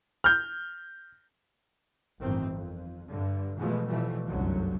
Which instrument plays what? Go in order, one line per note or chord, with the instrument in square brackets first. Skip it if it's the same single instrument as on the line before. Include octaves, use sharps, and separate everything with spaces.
[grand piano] F6 G6
[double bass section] G1 A2 D#3 E3 C4
F2
G2 D3
B2 E3 F3 G#3 A3
B2 E3 F3 G3 A3
G1 C2 F#2 D3 F#3